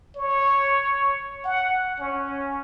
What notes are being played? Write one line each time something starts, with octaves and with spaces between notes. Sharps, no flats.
C#5
F#5
C#4